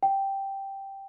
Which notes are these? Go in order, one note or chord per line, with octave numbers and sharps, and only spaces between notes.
G5